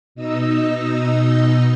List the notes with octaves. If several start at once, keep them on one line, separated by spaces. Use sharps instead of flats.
B2 D#4 D#5 E6